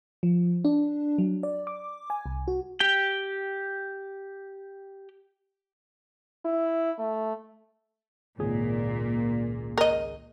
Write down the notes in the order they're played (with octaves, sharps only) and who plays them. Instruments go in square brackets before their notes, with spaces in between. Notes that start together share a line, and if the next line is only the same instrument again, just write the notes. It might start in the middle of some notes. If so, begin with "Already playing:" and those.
[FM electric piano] F3
D4
F#3
D5
D6
G#5
C2
F#4
[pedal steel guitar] G4 G5
[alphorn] E4
A3
[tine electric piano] G#1 C#2 G#4 [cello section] A#2
[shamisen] A#4 D#5